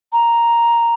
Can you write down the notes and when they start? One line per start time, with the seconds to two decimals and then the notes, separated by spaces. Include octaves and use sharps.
0.13 A#5